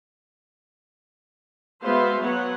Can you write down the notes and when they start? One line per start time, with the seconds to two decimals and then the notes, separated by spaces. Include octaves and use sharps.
1.83 G#3 B3 F#4 C5 E5 F5
2.20 F#3 B3 C#5 F#5